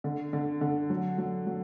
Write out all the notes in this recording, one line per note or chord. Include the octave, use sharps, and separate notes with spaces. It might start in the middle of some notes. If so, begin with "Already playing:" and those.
D3
D3
D3
F#3
F#3
F#3